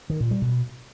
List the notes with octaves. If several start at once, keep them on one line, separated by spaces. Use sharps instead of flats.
D#3
A#2
G3
B2